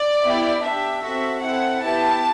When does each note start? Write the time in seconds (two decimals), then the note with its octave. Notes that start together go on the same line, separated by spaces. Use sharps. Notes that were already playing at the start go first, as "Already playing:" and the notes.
Already playing: D5
0.23 B3 E4 G4
0.63 D4 G4 E5
1.02 C4 F#4 A4 E5
1.43 C4 E4 A4 F#5
1.83 B3 E4 G4 A5